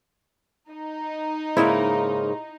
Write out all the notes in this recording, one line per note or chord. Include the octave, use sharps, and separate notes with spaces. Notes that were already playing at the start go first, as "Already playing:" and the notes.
D#4
G#2 C#3 A#3 E4